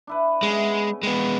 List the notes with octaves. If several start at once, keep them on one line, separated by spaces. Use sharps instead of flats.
D4 E4 B4
C#3 G#3 B3 E4
G#3 B3 G5